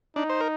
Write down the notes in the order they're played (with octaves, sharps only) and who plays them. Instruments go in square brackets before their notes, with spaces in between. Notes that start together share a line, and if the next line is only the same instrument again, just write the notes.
[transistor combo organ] D4 [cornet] D#4
[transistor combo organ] C5
A#4